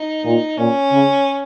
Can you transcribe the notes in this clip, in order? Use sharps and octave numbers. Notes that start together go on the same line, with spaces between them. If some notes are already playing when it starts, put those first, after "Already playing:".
Already playing: D#4
A#2
A#2 C#4
C#3